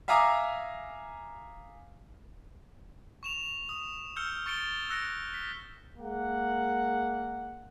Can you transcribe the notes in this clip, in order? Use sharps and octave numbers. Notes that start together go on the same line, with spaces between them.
E5 F5 G#5 A#5 D6 D#6
C#6 E7 F7
D#6
E6 F6 G6 C#7 G7
C#6 A6 C#7 D7 G7
E6 F#6 A#6 C#7 D7
B6
G#3 A#3 F#5